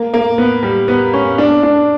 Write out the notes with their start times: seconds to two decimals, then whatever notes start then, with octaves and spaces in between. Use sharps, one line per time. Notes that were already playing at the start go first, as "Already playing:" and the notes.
Already playing: A#3
0.14 A#3
0.38 B3
0.63 G3
0.88 B3
1.13 C#4
1.38 D4
1.63 D4